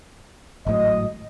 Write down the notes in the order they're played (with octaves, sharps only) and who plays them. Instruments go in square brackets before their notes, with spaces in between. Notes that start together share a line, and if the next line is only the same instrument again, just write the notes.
[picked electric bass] G#1 A2 F#3 [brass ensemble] D#5